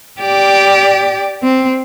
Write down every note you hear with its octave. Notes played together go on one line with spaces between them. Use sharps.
G4 D5
C4